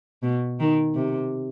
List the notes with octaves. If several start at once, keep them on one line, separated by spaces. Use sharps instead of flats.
B2
D#3
C3